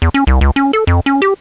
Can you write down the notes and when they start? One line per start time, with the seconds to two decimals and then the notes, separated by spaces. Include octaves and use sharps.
0.02 E2
0.14 C#4
0.27 C2
0.41 C#2
0.56 C#4
0.73 A4
0.87 F2
1.06 C#4
1.22 G4